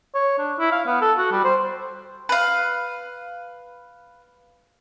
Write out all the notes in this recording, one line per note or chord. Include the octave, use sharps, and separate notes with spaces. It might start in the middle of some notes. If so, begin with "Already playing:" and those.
C#5
D4
E4
F5
B3
A4
F#4
G3
C5
B4 F5